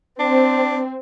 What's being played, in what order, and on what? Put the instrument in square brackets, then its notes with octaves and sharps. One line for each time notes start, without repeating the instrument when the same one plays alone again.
[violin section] C4 [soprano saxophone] D4